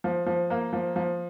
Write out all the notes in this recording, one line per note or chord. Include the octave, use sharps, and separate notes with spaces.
F3
F3
A#3
F3
F3